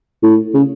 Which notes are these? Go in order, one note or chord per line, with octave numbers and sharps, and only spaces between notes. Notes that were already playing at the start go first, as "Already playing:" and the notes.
A2
C#3